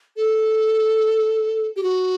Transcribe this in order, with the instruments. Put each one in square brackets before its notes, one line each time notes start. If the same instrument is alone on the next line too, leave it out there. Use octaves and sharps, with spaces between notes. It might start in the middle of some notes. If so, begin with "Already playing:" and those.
[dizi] A4
G4
F#4